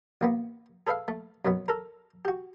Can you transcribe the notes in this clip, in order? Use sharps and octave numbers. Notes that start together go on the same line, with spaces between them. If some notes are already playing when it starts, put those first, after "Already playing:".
A1 A#3 B3
G#4 A4 B4 E5 F5
A3
F#2 B2 F#3 B3
A4 A#4
F#4 G4